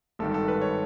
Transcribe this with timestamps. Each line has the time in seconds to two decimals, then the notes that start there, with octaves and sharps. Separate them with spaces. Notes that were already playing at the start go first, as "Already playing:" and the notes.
0.19 G#1 G2 D#3 A4
0.34 A4
0.48 B4
0.61 C#5